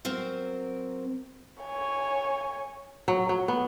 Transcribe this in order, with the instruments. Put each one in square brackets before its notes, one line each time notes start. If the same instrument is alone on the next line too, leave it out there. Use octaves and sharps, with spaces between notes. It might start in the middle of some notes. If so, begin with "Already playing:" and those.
[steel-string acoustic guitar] F#3 C4 A#4 C5
[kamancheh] C#5 G#5
[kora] F#3
F#3
B3